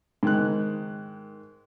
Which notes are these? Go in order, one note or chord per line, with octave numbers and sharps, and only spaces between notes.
G#2 D#3 F#6